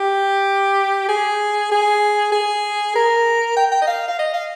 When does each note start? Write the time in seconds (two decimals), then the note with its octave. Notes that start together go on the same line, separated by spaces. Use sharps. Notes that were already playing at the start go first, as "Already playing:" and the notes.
Already playing: G4
1.09 G#4
1.72 G#4
2.32 G#4
2.95 A#4
3.57 G5
3.71 G5
3.82 D#5
3.87 F5
4.08 F5
4.19 D#5
4.33 F5